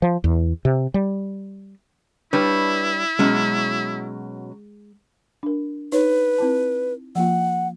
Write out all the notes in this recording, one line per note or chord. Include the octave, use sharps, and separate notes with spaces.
F3
E2
C3
G3
G3 D4 E4 B4 C#5
B2 F#3 G#3 C#4
D4 A#4
D#4 B4 C#5
C4 E4 A5
F3 A#3 F4 F#5